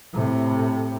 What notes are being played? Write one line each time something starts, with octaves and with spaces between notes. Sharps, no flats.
A2 C3